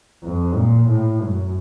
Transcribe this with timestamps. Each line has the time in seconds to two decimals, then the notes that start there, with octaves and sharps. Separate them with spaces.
0.23 F2
0.55 A#2
0.88 A2
1.20 F#2